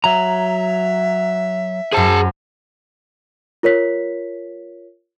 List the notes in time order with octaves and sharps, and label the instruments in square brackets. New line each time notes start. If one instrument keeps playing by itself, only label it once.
[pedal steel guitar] F#3 A#5 [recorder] E5
[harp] F#2 C5 [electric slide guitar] G#4 A5
[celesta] F4 A#4 C#5 B6